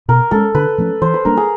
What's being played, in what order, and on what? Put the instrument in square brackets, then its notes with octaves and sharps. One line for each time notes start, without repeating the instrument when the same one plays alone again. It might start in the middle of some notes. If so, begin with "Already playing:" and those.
[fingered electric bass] B2 [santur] A#4
[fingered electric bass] G#3 C#4 [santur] A4
[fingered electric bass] D3 [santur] B4
[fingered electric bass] F3 A3 C#4
[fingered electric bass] E3 [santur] C5
[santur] B4
[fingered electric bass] G3 A#3 D4 [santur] A#4
[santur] G#4